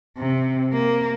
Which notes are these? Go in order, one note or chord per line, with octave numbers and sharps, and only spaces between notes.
C3
A#3